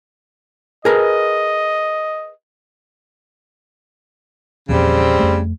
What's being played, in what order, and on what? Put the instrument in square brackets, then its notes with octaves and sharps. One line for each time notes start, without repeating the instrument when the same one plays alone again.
[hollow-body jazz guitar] G#4 A#4 B4 [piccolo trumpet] D#5
[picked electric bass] E2 A#2 F3 [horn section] C#3 G3 C4
[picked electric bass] F2 A3